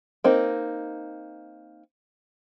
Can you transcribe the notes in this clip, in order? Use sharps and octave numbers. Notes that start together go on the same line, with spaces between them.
A#3 C4 D#4